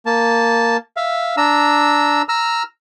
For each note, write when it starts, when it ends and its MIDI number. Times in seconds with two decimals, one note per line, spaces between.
0.06 0.77 58
0.06 0.77 81
0.97 1.35 76
0.97 1.35 77
1.37 2.22 62
1.37 2.22 82
1.37 2.22 88
2.29 2.63 82
2.29 2.63 88
2.29 2.63 89